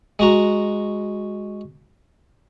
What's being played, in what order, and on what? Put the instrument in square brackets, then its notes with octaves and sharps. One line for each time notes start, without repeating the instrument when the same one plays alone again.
[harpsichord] G#3 F#4 A#5